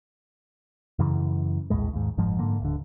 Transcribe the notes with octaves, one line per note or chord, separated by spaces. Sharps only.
F#2 C#3 E3
A#1 D#2 A2 G#3
D#2 G#2
F#1 G#2 F3 G#3
G#2 D3 A#3
D1 D3